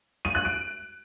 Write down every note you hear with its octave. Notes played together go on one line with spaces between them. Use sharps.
D#7
F#6
D7